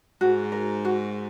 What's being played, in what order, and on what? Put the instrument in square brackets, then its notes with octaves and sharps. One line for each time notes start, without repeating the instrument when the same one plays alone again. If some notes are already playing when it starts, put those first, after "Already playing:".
[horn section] G#2 [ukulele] F#4
[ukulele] A#4
F#4